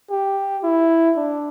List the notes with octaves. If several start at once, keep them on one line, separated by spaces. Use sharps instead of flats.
G4
E4
D4